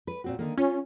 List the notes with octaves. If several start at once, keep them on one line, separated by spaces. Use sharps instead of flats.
B4
A#2 C4 F#4
D3 D#3 A#3
C#4 F4